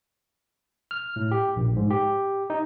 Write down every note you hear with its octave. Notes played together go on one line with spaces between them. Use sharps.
F6
A2
G4
A#1
G#2
G4
D#4